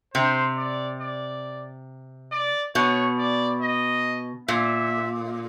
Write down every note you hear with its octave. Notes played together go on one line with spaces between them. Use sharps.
C3 C5
D5
D5
D5
B2 C#5
D5
D#5
A#2 E5